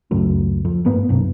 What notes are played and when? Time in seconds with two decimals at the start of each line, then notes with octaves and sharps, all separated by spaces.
0.11 C#2 F#2 A2
0.65 F2
0.85 G1 A2 A#3 B3
1.09 B1 F#2 C3 A#3